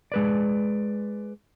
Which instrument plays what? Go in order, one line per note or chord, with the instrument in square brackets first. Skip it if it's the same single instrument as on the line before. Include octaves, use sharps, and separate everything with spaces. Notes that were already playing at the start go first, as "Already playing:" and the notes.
[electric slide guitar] G#3 B4 D5